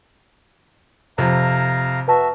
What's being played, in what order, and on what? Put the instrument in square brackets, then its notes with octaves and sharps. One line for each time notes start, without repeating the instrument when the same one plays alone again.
[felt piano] F2 C3 [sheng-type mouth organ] F5 A#5
[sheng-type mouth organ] F#4 E5 [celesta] B4 A5